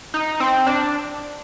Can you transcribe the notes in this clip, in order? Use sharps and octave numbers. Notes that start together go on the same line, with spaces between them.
D#4
C4
D4